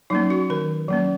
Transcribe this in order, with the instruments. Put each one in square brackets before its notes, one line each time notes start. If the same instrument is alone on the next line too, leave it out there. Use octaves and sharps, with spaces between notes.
[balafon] F#3 A#3 C#4 D#4
F#4
D#3 A#4
F#3 A#3 C#4